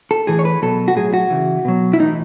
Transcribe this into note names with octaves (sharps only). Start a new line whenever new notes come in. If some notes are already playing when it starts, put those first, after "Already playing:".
A4
A2 E3 G#4
C#5
B4
B2 F#3 A4
F#4
A2 F#3 G#4
F#4
C#3 E3
B2 F#3
E4
A2 E3 D#4